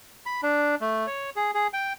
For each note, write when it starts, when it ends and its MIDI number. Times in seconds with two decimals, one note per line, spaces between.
0.26 0.41 83
0.43 0.75 62
0.81 1.06 57
1.07 1.30 73
1.36 1.51 68
1.54 1.67 68
1.73 1.93 79